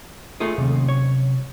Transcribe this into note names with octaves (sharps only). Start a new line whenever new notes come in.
A3 F4 G#4
D#2 C3 F#3 C#4
C#5